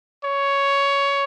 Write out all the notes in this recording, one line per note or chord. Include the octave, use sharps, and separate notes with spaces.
C#5